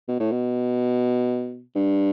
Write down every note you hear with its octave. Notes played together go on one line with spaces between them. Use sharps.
B2
A2
B2
G2